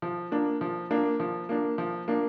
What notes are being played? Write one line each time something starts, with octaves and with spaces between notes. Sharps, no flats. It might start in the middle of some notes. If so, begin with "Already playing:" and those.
F3
A#3 D4
F3
A#3 D4
F3
A#3 D4
F3
A#3 D4